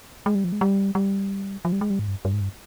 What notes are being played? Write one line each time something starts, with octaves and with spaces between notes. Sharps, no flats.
G#3
G3
F3
G#3
G3
G3
F3
G3
G#3
G3
G#2
G2
G2
G#2
G2